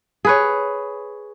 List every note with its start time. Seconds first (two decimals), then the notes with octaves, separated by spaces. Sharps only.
0.25 G#4 B4 C#5